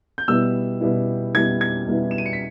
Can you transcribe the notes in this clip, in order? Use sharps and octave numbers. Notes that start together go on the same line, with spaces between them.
G6
B2 G3 B3 E4 E6
B2 G3 B3 E4
B2 G3 B3 E4 G#6
G#6
B2 G3 B3 E4
E7
D#7
C#7
B6